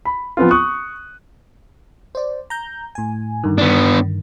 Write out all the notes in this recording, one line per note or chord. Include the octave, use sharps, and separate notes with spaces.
B5
F3 B3 C4 F4
C#6 D#6 F#6
C5 D5
A#5 G6
A2 G#5
G2 D3 D#3
B3 D4